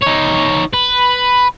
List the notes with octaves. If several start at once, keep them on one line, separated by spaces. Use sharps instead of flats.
D#4 C#5
B4